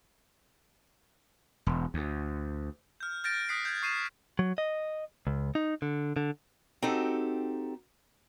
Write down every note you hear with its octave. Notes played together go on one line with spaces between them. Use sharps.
E1
D2
F6 G6
F6 G6 A6 A#6 D7
D#6 F#6 B6 C7
G6 G#6
C#6 C7 D#7 E7
F#3
D#5
C#2
D#4
D3
D3
C4 D#4 F#4 G4 A4